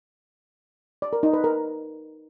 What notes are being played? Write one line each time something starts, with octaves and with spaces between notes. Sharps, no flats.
D5
A#4
D#4
B4
A#4